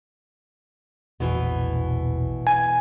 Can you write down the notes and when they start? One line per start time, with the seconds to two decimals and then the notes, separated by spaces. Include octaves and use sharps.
1.20 E1 A#1 B2 E3
2.47 G#5